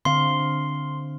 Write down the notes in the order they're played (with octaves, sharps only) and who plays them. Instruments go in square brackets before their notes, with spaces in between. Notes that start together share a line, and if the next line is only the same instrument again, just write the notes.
[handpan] D3 C4 F5 [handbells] C6